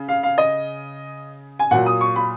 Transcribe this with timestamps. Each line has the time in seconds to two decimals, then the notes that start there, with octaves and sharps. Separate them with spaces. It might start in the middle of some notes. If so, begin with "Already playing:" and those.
Already playing: C#3
0.08 F5
0.23 F5
0.38 D#5
1.59 G#5
1.71 A#2 F#3 F#5
1.86 D#6
2.01 C#6
2.16 B5